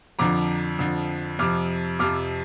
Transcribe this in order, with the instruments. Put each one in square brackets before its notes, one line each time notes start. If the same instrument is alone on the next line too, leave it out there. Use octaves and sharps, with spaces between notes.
[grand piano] F2 D3 F3 A#5 D6
F2 D3 F3
F2 C3 F3 D6 F6
F2 C3 F3 D6 F6